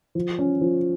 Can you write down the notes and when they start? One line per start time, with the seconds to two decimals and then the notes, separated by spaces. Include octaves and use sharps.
0.15 F3
0.39 C#4
0.61 F3